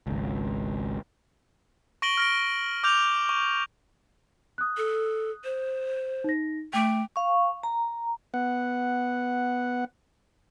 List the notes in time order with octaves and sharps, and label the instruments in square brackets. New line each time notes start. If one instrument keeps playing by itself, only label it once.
[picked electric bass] G#1 C#2
[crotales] C#6 A#6 D7 F#7 G7
F6 A#6 D7
D6 F6 G6 F7
C#6
[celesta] D#6 F#6
[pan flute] A4
C5
[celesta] D#4 A#6
[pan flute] A3 [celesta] G5 D6 D7
[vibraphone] F5 C#6
A#5
[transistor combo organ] B3 F#5